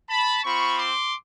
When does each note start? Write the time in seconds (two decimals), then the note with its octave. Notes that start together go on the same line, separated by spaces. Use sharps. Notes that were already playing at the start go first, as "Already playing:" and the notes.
0.10 A5 B5
0.44 C4 F4 B5 C#6
0.78 C6 D6